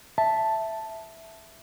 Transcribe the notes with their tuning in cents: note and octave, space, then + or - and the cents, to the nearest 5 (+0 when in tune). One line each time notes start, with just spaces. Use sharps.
E5 +0 A5 +0